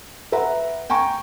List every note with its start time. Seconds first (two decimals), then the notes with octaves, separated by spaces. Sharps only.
0.32 B4 E5 F#5 A#5
0.90 G5 G#5 A#5 C#6